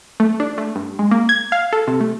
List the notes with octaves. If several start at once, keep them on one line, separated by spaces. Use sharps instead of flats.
A3
D4
A3
G2
G#3
A#3
G#6
F5
A4
C3
A3